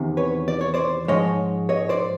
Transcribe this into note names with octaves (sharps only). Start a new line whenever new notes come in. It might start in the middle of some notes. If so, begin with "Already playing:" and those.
Already playing: E2 C3 D#3
B4 C#5
D5
C#5
C5 D5
G#2 F3 G#3 C#5 D#5
C#5 D#5
C5 D5